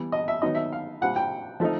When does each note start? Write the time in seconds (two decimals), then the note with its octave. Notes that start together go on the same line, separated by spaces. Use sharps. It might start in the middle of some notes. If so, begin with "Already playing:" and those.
Already playing: E3 G3 B3
0.12 D#5
0.28 E5
0.42 D#3 F#3 B3 D#4 D#5
0.55 E5
0.72 F5
1.01 A#2 G3 C4 F#5
1.16 G5
1.60 F3 A3 C4 D#4